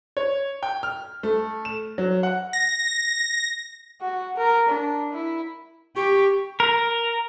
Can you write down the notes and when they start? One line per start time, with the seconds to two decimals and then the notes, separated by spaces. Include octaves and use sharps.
0.17 C#5
0.63 G5
0.83 F6
1.23 A3
1.65 E7
1.98 F#3
2.23 F#5
2.53 A#6
2.87 A#6
4.01 F#4
4.37 A#4
4.69 D4
5.13 E4
5.96 G4 C#6
6.60 A#4